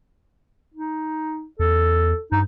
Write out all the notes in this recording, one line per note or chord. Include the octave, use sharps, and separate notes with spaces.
D#4
E2 A4
G2 D#4